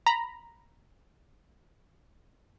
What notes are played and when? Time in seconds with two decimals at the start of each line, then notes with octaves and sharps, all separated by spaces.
0.07 A#5 B5